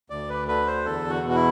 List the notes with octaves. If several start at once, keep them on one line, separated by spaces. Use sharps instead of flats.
D2 D5
B4
D3 B4
C5
E2 A4
F#4
B2
F#4
E4